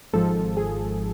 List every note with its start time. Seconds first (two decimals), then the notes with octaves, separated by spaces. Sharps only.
0.13 G#1 G#2 F3 A4
0.57 G#4